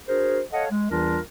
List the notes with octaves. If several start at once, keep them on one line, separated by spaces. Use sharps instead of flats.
D4 F#4 G#4 A#4 C5
A4 C#5 D#5 F5 F#5
G#3
E2 E3 G3 D4 F4 A#4